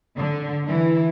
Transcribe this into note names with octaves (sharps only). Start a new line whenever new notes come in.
D3
E3